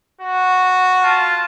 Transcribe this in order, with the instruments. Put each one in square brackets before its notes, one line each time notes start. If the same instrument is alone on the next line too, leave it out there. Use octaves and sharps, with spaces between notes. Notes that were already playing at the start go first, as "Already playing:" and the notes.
[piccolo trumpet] F#4
[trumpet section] F4 A5